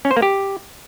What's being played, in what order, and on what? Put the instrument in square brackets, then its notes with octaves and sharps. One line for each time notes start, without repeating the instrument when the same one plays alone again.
[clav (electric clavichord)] C#4
C5
A#3
G4